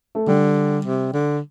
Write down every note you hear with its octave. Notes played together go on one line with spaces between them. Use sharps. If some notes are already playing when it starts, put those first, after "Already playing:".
A3
D3 G3
C3
D3